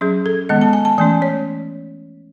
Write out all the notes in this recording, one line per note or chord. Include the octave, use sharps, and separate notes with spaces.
F#3 C#4 G#4
A4
D#3 G#3 B3 D#5
A5
G#5
A5
E3 A3 C#4 G#5
C#5